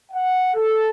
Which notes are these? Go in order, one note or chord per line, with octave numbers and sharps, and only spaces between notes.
F#5
A4